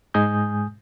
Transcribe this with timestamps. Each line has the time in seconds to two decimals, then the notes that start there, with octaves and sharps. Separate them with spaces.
0.14 G#2 G#3 G#5 D#6 G6